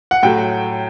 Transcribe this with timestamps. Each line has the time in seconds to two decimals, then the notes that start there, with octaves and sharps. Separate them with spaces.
0.11 F#5
0.23 A2 F#3 A3 G5